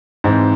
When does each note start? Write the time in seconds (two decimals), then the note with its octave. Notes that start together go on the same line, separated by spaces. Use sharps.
0.24 G#2 E3 C4